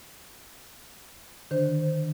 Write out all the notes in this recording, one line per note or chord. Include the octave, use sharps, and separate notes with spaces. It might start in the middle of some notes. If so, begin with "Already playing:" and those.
D3 D#3 D4 C5